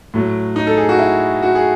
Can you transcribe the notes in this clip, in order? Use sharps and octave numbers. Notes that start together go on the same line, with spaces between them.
A2 F#3
D#4
A4
G#4
F#4
E4
F#4
G#4